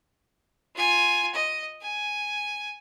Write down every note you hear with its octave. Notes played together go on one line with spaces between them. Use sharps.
F4 G#5
D#5
G#5